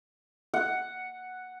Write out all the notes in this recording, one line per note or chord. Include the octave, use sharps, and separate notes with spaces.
F#5